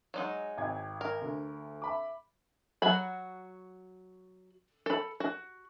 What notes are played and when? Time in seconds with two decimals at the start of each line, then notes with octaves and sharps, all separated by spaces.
0.14 F#3 G#3 D#4
0.57 G#1 G5 G#6
1.01 A#4
1.21 D2
1.82 E5 B5 D6
2.82 F#3 F#4 B5
4.86 A4 B5
5.20 F#4